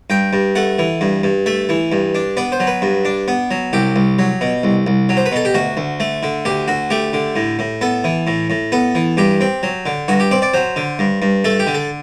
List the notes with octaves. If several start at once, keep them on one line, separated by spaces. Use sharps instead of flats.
G2 G5
G2
A3 F#5
E3
G2
G2
A3 E5
E3
G2
D4
B3 D5
C5
F#3
B4
G2
D4
B3
F#3
C2 G4
C2
F#3
B2
C2
C2
F#3
C5
B4
B2 A4
G4
D2 F#4
D2
A3
D3
D2 G4
D2 F#4
A3 G4
D3
A2
A2
B3 A4
E3
A2
A2
B3 A4
E3
G2 G4
C4
F#3
D3
G2 F#4
G4
C4 D5
D5
F#3 C5
D3
G2
G2
A3 A4
G4
D3
A4